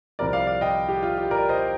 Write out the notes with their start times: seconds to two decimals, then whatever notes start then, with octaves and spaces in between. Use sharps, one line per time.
0.19 C2 C3 F3 A#4 D5
0.33 D5 F5
0.47 D5 F5
0.61 D#5 G5
0.89 G4
1.02 F4
1.17 G4
1.31 A#4 D5
1.49 C5 D#5